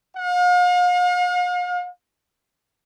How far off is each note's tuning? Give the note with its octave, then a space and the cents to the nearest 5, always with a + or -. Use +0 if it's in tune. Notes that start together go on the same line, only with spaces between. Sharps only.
F5 +45